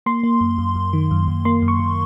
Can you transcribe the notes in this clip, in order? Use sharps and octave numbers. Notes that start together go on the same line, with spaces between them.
A#3 C6
A#3
F#2
F#2
F#2
D#3
F#2
F#2
A#3 C6
F#2
C#6
F#2